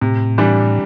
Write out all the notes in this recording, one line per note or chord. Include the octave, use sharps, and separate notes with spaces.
A2 C3
E3 G3 D4